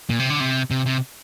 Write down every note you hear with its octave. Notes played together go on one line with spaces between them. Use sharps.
A#2
C3
D3
C3
C3
C3